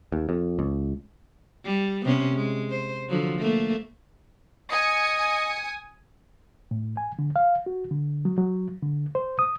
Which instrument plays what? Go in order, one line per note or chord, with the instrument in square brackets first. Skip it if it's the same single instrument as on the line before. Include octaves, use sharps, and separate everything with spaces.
[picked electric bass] D#2
F2
C#2
[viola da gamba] G3
C3 B3 C#4
G#3
C5
D3 F3 F#3
A3 A#3
[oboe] D#5 [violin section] G#5 D#6 C#7
[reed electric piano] A2
G#5
D3
F5
F#4
D3
F#3
F#3
D3
C5
D#6